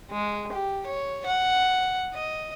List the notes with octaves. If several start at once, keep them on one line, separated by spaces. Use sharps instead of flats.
G#3
G4
C#5
F#5
D#5